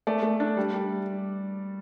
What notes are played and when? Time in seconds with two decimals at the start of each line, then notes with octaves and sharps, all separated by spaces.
0.07 A3 D5
0.23 A3
0.40 D4
0.57 G3
0.74 G3